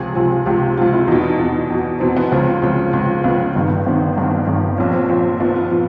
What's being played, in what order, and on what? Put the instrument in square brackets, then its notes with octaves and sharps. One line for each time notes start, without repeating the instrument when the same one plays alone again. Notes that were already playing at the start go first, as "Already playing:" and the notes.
Already playing: [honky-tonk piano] C#2 C3 F3 G#4
C#2 C3 F3
C#2 C3 F3 G4
C#2 C3 F3 F4
E4
E2 B2 D#4
E2 B2
E2 B2
E2 B2 C4
B3
C#2 C#3 F3 C4
C#2 C#3 F3
C#2 C#3 F3
C#2 C#3 F3 B3
G1 G2 D#3
G1 G2 D#3 C4
G1 G2 D#3
G1 G2 D#3
A#1 A#2 F3 C#4
C4
A#1 A#2 F3 C4
A#1 A#2 F3 B3
F4
A#2 F3